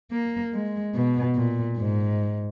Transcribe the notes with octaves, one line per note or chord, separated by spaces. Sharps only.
A#3
G#3
B2
A#2
G#2